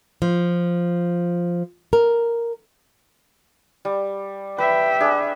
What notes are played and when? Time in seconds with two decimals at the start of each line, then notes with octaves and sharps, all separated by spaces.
0.22 F3
1.93 A#4
3.85 G3
4.58 B4 E5 G5
5.01 D4 G#4